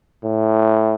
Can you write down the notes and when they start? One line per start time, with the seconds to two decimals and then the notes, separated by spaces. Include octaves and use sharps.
0.24 A2